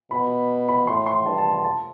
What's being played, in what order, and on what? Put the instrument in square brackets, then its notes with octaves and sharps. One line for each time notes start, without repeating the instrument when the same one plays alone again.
[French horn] B2 [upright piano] B5
[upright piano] B5
[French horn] A2 [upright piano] C6
[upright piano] C6
[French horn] G2 [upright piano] A5
[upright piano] A5
A5
A5